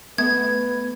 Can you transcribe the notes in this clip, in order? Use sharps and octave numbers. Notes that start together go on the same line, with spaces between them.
A3 B3 B4 G#6